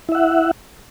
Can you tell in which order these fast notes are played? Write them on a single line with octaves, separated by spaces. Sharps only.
E4 E5 F#5